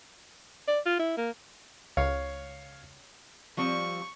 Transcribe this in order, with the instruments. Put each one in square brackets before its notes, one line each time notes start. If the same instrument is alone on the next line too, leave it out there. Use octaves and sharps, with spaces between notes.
[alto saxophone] D5
F4
E4
A#3
[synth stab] C#2 [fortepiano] C#5 F5
[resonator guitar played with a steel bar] F3 G3 C4 [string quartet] C#6